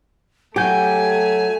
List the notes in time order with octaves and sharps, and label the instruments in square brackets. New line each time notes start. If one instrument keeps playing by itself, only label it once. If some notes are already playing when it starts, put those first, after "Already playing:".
[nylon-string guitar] F#3 [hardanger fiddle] A3 [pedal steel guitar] G4 G6 [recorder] G#5